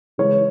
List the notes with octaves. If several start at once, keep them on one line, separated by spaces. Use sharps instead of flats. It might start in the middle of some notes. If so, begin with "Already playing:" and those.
C#3 E3 G#3 C#5